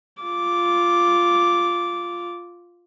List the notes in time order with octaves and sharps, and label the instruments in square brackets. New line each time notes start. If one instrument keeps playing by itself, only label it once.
[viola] F4 D6